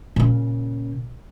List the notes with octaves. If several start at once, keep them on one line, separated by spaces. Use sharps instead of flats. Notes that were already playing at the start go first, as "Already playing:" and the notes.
A#2 C#3